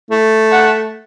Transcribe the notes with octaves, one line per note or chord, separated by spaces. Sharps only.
A3
F#5